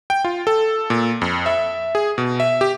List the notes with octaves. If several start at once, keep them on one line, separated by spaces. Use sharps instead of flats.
G5
F4
A4
A#2
F2
E5
G#4
B2
E5
G4